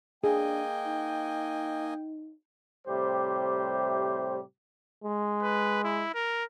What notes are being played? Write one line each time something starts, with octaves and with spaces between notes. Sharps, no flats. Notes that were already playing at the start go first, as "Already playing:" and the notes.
A#3 D4 G#4 D#5 G5 G#5
D#4
A2 C3 G3 G4 C5
G#3
B4
E4
A#4